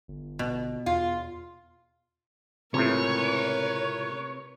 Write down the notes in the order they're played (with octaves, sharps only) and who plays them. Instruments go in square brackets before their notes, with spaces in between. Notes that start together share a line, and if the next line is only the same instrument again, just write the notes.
[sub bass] G1
[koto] B2
[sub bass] E2 [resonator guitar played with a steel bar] F4
[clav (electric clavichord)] C#2 A2 [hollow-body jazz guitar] C3 [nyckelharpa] A#4 B4 [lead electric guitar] C#5